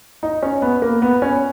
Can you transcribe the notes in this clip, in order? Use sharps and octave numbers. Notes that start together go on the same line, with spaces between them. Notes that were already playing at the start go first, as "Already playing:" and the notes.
D#4
C#4
B3
A#3
B3
C#4